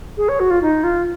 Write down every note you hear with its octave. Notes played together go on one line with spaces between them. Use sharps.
G#4
C#5
F#4
F4
D#4
F4